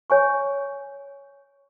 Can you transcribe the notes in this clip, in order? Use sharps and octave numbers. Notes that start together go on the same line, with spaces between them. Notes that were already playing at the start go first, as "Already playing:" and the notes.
C#5 G#5 C#6